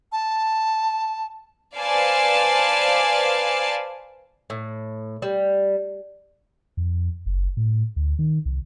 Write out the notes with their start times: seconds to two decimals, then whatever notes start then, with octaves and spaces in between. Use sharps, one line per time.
0.12 A5
1.75 B4 C5 D5 F5 G#5 A5
4.50 A2
5.22 G3
6.77 F2
7.26 F#1
7.57 A2
7.96 D2
8.19 D#3
8.45 C2